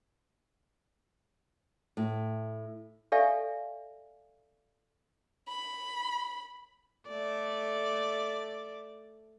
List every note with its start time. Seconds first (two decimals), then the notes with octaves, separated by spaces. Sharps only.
1.97 A2
3.12 G4 A4 D5 E5 F5 G#5
5.48 B5
7.09 A3 D5